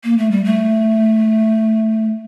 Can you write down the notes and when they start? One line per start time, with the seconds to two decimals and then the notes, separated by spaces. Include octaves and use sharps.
0.04 A#3
0.18 A3
0.31 G3
0.45 A3